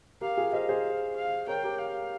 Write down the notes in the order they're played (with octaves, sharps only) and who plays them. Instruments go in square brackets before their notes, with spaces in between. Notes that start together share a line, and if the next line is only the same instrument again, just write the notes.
[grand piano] G4 A#4 [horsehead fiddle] F5
[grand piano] F4 G#4
[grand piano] C5 D#5 [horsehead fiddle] F5
[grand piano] G#4 C5
[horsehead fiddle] F5
[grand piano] A#4 C#5 [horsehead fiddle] G5
[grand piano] G4 A#4
[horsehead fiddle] F5